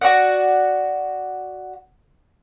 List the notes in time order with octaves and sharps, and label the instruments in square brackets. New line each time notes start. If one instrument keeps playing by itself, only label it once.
[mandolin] F#4 D5 F#5